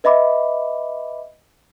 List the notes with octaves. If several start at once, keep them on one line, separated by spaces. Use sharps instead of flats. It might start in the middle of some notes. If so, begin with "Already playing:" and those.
B4 D#5 E5 B5 D6